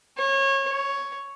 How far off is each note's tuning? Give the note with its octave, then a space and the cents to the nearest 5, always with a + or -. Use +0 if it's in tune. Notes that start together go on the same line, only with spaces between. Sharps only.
C#5 -25
C#5 +5